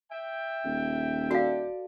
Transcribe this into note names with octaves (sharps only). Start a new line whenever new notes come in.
E5 G5
D#1
F#4 A4 D5 F5